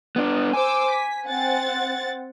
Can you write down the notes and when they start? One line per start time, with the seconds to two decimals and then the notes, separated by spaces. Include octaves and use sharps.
0.16 B3 D4
0.53 C5 G#5 D6 E6
0.89 B6
1.25 C4 F#5 A6